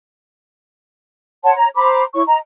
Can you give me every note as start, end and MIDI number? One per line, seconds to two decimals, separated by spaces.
1.43 1.53 73
1.43 1.53 78
1.43 1.53 81
1.43 1.53 84
1.55 1.69 73
1.55 1.69 82
1.76 2.03 72
1.76 2.03 82
1.76 2.03 83
1.76 2.03 86
2.14 2.22 64
2.14 2.22 73
2.14 2.22 85
2.27 2.37 75
2.27 2.37 82